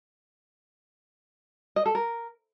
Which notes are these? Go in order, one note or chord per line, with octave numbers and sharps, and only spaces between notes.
D#5
A4
A#4